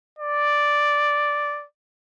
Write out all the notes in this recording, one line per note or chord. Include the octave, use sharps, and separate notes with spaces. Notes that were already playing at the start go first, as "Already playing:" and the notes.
D5